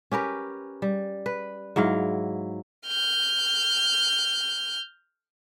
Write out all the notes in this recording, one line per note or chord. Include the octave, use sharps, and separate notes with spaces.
C#4 G4 A#4 B4
G3
B4
G#2 F#3 E4 F5
F6 G6